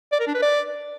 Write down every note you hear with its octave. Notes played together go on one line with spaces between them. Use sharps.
D5
A#4
D4
B4
D5